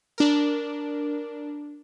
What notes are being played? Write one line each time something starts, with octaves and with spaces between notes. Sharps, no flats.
D4 A#4